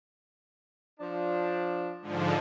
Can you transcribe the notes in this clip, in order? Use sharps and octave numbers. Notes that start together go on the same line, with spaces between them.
F3 D4
G#2 D3 F3